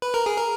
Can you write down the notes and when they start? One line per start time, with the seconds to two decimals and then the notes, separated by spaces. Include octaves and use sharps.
0.02 B4
0.14 A#4
0.26 G#4
0.38 A#4